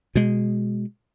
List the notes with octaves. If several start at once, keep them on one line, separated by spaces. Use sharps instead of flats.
B2 G#3